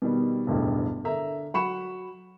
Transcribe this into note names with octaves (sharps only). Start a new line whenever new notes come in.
B2 D#3 G3
E1 A1 D2 G2
D3 A#4 E5 A#5
F#3 F#5 B5 C#6 C#7 E7